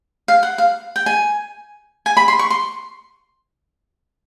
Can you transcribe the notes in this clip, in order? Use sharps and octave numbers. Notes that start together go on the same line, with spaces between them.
F5
F#5
F5
G5
G#5
G#5
B5
C6
C#6
C6